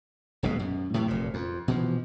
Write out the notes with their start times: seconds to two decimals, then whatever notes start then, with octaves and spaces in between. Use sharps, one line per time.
0.43 D#1 B1 B2 G#3
0.59 F#2
0.94 A2 C3 E3
1.08 F1 A#2
1.34 F2
1.68 B2 E3 F3